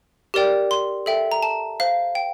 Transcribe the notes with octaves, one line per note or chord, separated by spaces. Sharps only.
G4 A#4 D5 G5
C6
A4 E5 G5
A#5
A5
C5 F5
G5